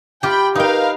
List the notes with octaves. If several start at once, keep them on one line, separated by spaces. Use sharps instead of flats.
F4 G4 G5 B5
D#4 A#4 B4 F5 G5